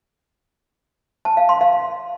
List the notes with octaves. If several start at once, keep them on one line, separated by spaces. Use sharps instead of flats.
A5
F5
C6
F5